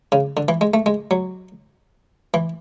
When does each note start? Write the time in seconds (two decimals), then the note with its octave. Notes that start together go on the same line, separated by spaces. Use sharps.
0.12 C#3
0.37 D3
0.48 E3
0.61 G#3
0.74 A3
0.86 G#3
1.11 F#3
2.34 E3